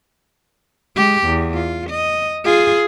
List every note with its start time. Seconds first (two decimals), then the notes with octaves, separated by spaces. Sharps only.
0.96 G#3 G4
1.25 E2
1.54 F4
1.89 D#5
2.45 F4 G#4